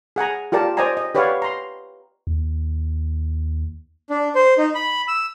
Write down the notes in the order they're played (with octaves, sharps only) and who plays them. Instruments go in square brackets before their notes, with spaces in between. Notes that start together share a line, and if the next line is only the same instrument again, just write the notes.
[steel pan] G#4 F#5 G#5 A#5
F4 G4 A#4 D5 A5
C5 D5 D#5 G5 G#5 A#5
D#5
G4 B4 C#5 D5 F5 F#5
A#5 C6
[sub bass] D#2
[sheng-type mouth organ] D4
C5
D#4
B5
E6